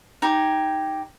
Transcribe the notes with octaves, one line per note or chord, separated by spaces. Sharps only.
D#4 G4 G#5